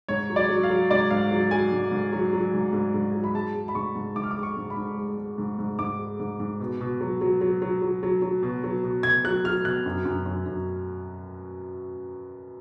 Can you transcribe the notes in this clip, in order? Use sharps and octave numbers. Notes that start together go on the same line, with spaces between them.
G#2 C#5
F#3
D5
F#3
F5
F#3
G#2 D5
G#2 F5
F#3
F#3 G#5
G#2
G#2
F#3
F#3
G#2
G#2
G#2
F#3
B5
G#3 A5
G#3
B5
G#2 C#6
G#2
G#2 D6
F6
D6
G#3
C#6
G#2
B5
G#2
G#3
G#3
G#2
G#2
G#2 D6
G#3
G#2
G#2
B2
B2
F#3
F#3
F#3
F#3
F#3
F#3
F#3
B2
F#3
B2
B2 G#6
F#3 F#6
F#3 F6
B2 F#6
F#2
F#2
F#2
F#2